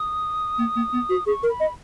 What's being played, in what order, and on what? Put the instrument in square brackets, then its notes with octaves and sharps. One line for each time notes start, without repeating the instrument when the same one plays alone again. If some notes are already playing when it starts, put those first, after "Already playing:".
Already playing: [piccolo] D#6
[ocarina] A#3
A#3
B3
F#4
[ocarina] G#4 [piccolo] C#6
[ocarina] A#4
[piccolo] B5
[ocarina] D#5